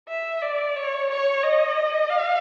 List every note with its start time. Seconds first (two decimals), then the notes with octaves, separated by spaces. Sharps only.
0.08 E5
0.42 D5
0.76 C#5
1.09 C#5
1.43 D#5
2.10 F5